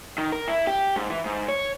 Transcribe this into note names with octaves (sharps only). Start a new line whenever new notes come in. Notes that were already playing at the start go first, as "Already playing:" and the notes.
D#3
A#4
E4
G4
G#2
E3
G#2
C#5